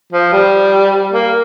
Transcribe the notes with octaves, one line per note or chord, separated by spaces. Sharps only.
F3
G3
A#3